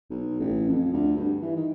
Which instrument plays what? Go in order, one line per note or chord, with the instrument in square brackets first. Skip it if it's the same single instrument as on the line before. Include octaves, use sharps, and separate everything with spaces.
[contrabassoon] B1
A1
F2
D2
G2
E3
D#3